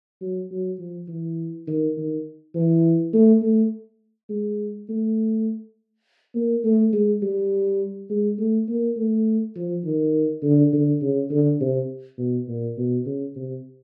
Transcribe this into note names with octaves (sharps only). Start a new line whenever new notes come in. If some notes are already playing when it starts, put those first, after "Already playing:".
F#3
F#3
F3
E3
D#3
D#3
E3
A3
A3
G#3
A3
A#3
A3
G#3
G3
G#3
A3
A#3
A3
F3
D#3
D3
D3
C#3
D3
C3
B2
A#2
B2
C#3
C3